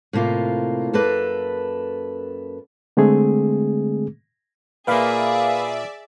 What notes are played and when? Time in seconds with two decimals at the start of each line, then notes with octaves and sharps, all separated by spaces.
0.13 A2 C3 A#3 F4
0.93 F#2 A#3 A4 B4
2.97 D3 G#3 A3 C4 G#4
4.87 A#2 A#3 G#4 B4 D5 E5 F5 B5